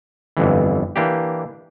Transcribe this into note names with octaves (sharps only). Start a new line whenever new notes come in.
G1 F2 E3
E3 A#3 D4 G4